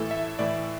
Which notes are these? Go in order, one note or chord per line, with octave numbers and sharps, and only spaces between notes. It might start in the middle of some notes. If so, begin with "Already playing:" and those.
Already playing: A2 E3 A3 E4 A4
E5
A2 E3 A3 E4 D5